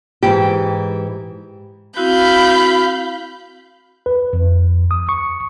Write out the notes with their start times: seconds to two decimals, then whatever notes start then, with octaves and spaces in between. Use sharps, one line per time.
0.23 G#2 E3 G4
1.97 C4 E4 F#4 F5 B5 G6
4.06 B4
4.33 F2
4.91 D#6
5.09 C#6